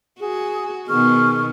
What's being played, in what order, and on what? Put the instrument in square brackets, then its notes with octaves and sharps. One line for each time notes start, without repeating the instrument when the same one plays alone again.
[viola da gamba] F#4 [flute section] G#4
[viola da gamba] B2 D#3 B3 [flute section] G#4 C#6 F6